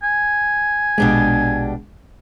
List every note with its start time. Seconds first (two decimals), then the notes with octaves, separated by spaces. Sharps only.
0.03 G#5
0.98 A#1 B2 G#3 D4 G4